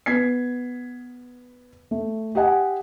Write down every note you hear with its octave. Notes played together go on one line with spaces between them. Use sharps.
B3 G#6 B6 C7
A3
G4 D#5 F#5 G#5